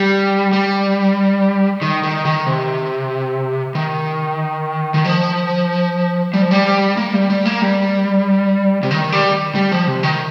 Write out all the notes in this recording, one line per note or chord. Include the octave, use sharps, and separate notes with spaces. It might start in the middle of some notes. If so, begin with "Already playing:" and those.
Already playing: G3
G3
D#3
D#3
D#3
C3
D#3
D#3
F3
G3
F3
G3
A#3
G3
G3
A#3
G3
C3
D#3
G3
G3
F3
C3
D#3